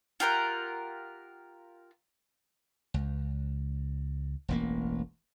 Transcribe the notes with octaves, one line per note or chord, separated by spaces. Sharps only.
F4 G4 A#4 F#5
C#2
E1 A1 A#3